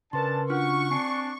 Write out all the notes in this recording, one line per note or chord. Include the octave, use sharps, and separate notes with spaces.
C#3 C#4 D4 A#4 B4 A5 C6
D4 F4 F#4 F#5 C#6 F6
C4 D4 G#5 C7